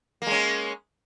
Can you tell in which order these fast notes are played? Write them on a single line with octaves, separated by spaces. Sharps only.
A#3 G#3 C#4